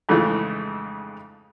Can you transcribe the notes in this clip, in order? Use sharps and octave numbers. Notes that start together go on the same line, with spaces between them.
F2 G#2 C#3 E3 A3 F4